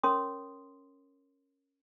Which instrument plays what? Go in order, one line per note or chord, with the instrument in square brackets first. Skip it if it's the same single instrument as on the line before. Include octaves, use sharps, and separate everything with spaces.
[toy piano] C#4 A#4 C#5 C6 D#6